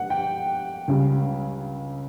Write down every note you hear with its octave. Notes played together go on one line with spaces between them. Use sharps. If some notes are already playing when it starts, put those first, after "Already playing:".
Already playing: F#5
G5
C#2 C#3 G3 C#4